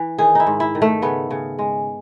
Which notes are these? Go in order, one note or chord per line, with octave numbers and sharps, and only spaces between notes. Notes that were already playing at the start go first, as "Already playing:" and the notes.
Already playing: E3
D#3 G#4
D#4 E4
G#2
E4
D#3
A3
C#3 B3
C#3
G#3